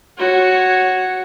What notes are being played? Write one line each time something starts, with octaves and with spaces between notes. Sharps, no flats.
F#4 C#5